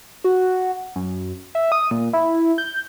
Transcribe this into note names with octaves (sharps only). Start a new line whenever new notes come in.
F#4
F#2
E5
D#6
A#2
E4
G6